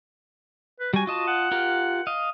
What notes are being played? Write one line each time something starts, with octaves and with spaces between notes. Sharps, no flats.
B4
G3 F#4 G#5
F4 D#5 A5
F#5
F4 G4 A#4
D#5 F5